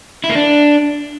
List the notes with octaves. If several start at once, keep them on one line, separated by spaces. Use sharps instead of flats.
E4
A#3
D4